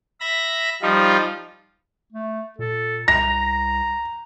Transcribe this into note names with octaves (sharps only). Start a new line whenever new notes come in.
E5 B5 A#6
F3 G3 D#4 F4
A3
A#2 A4
C2 A#5 A#6